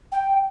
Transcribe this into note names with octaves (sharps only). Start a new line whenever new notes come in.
G5